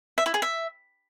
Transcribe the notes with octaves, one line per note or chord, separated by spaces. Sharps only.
E5
E4
G#4
E5